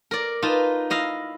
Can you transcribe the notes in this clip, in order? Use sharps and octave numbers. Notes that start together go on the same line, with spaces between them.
A#4 D5
D#4 F4 B4 A5
E4 D#5 F5